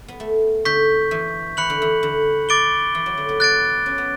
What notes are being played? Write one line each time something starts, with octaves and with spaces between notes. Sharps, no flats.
B3
A3
D3 C#6 G6 B6
E3
E3 B5 F#6 C#7 F#7
D3
E3
D3
D6 A6 D7 G7
E3
F#3
D3
B3
B3 F#6 A6 D7
C#4
B3